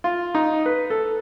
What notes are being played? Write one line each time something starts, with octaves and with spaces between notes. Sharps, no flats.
F4
D#4
B4
A4